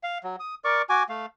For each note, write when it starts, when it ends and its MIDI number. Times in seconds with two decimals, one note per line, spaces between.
0.03 0.18 77
0.24 0.36 54
0.40 0.55 87
0.65 0.82 70
0.65 0.82 74
0.65 0.82 85
0.65 0.82 86
0.89 1.03 66
0.89 1.03 80
0.89 1.03 86
1.09 1.26 57
1.09 1.26 77